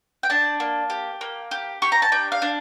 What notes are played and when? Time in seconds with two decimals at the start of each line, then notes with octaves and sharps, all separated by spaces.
0.23 G5
0.30 D4 A5
0.60 A#3
0.90 G4
1.21 A#3
1.51 G4
1.82 G4 C#6
1.92 A#5
2.02 A5
2.12 D4 G5
2.32 F5
2.42 D4